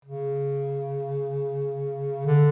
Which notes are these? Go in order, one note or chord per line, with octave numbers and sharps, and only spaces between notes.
C#3
D3